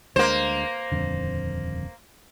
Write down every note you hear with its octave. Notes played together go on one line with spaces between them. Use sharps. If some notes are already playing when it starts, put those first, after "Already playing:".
D2 G#3 A#3 D4 C5
D#1 F2 D3